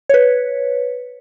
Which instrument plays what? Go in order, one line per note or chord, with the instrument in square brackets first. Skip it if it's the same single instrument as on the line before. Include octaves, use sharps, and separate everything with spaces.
[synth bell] B4 C#5